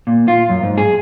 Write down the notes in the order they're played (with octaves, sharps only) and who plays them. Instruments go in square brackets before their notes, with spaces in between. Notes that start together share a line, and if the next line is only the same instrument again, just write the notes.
[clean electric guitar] A#2
F4
F#2
G#2
G#4